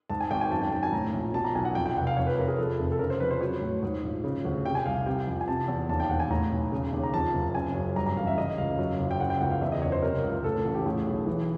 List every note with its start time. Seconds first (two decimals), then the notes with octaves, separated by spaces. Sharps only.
0.10 G#2 A5
0.20 G#5
0.31 G#1 G5
0.41 G#5
0.52 F#2 A5
0.62 G5
0.72 G#1 A5
0.83 G#5
0.92 A2 A#5
1.13 A#1
1.34 B2 A5
1.44 A#5
1.55 B1 G#5
1.65 F#5
1.75 F2 G5
1.86 G5
1.96 F1 F#5
2.07 F5
2.17 F2 C#5
2.27 B4
2.37 F1 A#4
2.48 G#4
2.58 F2 A4
2.79 F1
2.92 A4
2.99 C#3 A#4
3.10 C5
3.20 F2 B4
3.31 C5
3.41 F#3 C#5
3.62 A2
3.82 G#2
4.03 A#1
4.24 C#3
4.45 D2
4.65 C3 G5
4.75 G#5
4.86 C2 F5
5.06 C3 G5
5.27 F2
5.41 G#5
5.48 C3 A5
5.68 E2
5.89 D#2 A5
6.00 G5
6.10 E1 F#5
6.20 G#5
6.30 A2 A#5
6.51 B1
6.72 C#3
6.92 D#2
7.04 A#5
7.14 F2 A5
7.33 F#1
7.55 C#3 G#5
7.75 F#2
7.96 G2 A#5
8.06 A#5
8.16 A1 F5
8.27 E5
8.37 C#3 D#5
8.58 C#2 F5
8.79 F#2
9.00 F#1
9.11 G5
9.20 C#3 F#5
9.30 G5
9.41 C#2 F#5
9.51 F5
9.61 E2 E5
9.72 D#5
9.82 F#1 C#5
9.92 C5
10.02 C3 A#4
10.24 C#2
10.44 A2 A4
10.65 A1
10.75 G4
10.86 A2 G#4
11.07 B1
11.27 E3